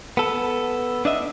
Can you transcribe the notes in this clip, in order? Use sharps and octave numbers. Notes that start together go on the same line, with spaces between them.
B3 A4
D4 D#5 E5